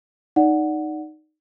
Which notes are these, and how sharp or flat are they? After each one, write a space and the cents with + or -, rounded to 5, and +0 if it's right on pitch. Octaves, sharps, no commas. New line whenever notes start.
D#4 -10 D5 -15 F#5 +0